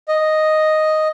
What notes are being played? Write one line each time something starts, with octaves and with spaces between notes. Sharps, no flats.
D#5